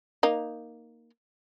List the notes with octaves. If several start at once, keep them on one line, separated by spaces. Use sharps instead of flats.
A#3 D#4